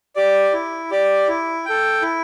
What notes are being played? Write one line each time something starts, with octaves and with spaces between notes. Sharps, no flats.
G4 D5
E4
G4 D5
E4
A4 G5
E4